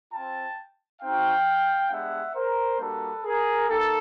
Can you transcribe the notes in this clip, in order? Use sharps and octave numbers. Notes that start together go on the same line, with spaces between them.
C4 F4 G5 A5
C4 D#4 F#4 F5 G5
G#3 B3 D4 G4 E5 F#5
A#4 C5
G3 A#3 D4 F#4 A4 B4
G#4 A#4
A#3 D#4 G4 A4